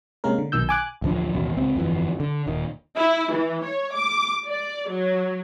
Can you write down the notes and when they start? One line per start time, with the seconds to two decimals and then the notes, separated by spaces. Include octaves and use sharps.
0.24 C3 G#3 A#3 C#4 A#4
0.38 D3
0.52 B1 B2 D#3 E6 G6
0.69 G#5 D6 F#6
1.02 A1 D2 F3 D4
1.34 A1 D#2 B2
1.57 C#2 C4
1.75 G1 F2 D3 E3
2.20 D3
2.47 D#1 D#3
2.98 E4
3.33 E3
3.64 C#5
3.94 D6
4.46 D5
4.89 F#3